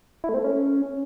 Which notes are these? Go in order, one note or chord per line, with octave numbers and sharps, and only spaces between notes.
E4
A3
C4
A3
C#4